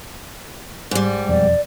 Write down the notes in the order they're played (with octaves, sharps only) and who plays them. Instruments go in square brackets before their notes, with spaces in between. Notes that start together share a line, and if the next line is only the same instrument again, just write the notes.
[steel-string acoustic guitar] G#2 G3
[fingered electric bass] E1 F2 [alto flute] D5